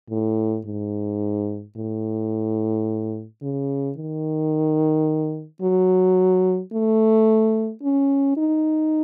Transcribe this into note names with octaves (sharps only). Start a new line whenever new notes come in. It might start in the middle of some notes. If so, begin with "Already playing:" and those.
A2
G#2
A2
C#3
D#3
F#3
A3
C#4
D#4